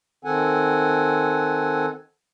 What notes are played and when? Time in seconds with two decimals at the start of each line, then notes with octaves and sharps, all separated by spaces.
0.25 D#3 C4 A4 F#5 G#5